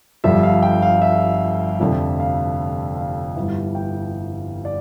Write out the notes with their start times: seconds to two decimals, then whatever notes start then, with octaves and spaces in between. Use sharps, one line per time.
0.24 G1 G2 D3 F3 E5
0.43 F5
0.63 G5
0.82 F5
1.02 E5
1.80 F1 F2 D3 F3
2.20 F5
2.97 F5
3.36 G1 G2 E3
3.75 G5
4.65 D5